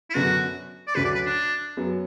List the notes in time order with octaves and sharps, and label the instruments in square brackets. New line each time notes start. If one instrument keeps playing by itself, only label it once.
[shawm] E4
[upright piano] F#2 D3 F#3 B3 [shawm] F#4
[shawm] D5
[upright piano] D2 D3 F#3 [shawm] B4
[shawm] D5
B4
D4
[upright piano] F#2 F#3 B3